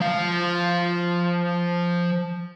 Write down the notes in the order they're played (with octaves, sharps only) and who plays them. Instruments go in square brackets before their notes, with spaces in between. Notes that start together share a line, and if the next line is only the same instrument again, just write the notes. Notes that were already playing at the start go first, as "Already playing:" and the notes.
[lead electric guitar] F3 F5